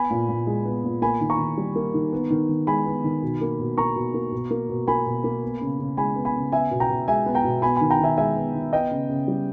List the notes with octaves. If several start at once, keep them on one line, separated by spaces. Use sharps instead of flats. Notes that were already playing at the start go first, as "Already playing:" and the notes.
Already playing: B3 G#5 B5
A#2
A#2
G#3
B3
A#2
A#3 G#5 B5
D#3
A#5 C#6
D#3
G3
A#3
D#3
B3
D#3
D#3
G#3 G#5 B5
B3
D#3
B2
A#3
B2
A#3 A#5 C#6
B2
A#3
B2
A#3
B2
A#3 G#5 B5
B2
A#3
B3
C#3
C#3
G#3 G#5 B5
B3
G#5 B5
C#3
B3 E5 G#5
B2
G5 A#5
B2
G#3 E5 G#5
B3
G5 A#5
B2
B3 G#5 B5
D#3 G#5 B5
G5 A#5
D#3 E5 G#5
G#3 E5 G#5
B3
D#3
B3 D#5 G5
C#3
C#3
G3